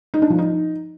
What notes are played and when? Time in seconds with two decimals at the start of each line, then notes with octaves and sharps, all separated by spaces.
0.14 D#4
0.22 D4
0.30 F3
0.39 D#4